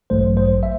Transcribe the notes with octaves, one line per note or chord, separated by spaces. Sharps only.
A1 G2 F#3 A3 C5
C5
E5